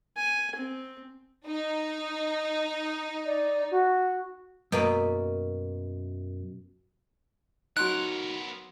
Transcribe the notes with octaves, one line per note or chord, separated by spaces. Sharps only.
G#5
C4
D#4
D5
F#4
F#2 B2 A#3 B5
F#3 B3 D#4 F#4 A#4 C6 F#6 D7